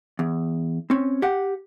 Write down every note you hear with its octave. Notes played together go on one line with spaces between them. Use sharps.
E2
C4 C#4
G4 F#5